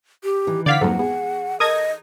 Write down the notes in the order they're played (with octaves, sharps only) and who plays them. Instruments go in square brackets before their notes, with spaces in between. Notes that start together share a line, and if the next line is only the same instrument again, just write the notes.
[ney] G4
[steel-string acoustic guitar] D#3 E3
[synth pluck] D3 G6 G#6 [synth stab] D5 F5 B6 [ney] F#5
[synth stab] F2 G#2 [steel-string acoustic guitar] F#3 A#3 [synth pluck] A4
[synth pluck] B3 [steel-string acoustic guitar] G#4
[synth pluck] A4 A#4 [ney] D#5 [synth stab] D#6 G#6 A#6